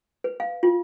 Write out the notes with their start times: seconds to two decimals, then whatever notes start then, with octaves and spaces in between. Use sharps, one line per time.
0.24 B4
0.40 F5
0.63 F4